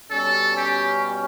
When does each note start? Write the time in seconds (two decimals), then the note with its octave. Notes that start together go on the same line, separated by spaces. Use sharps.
0.10 B2 G3 C#4 A4
0.57 G4